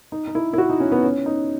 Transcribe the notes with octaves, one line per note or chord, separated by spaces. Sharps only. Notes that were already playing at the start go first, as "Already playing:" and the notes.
D#4
D#4
E4
E4
F#4
D#4
C#4
B3
C#4
D#4